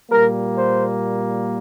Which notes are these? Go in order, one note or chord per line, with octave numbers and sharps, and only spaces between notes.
A#2 G3 A#3 A#4
C5